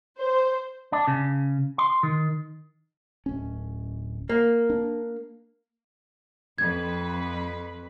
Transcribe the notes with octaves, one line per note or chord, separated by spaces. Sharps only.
C5
D4
C#3
C6
D#3
D1 C#4
A#3
D4
F2 B4 G#6